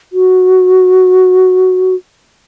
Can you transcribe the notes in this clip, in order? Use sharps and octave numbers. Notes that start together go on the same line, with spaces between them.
F#4